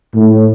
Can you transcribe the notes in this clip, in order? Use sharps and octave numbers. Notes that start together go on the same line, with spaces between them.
A2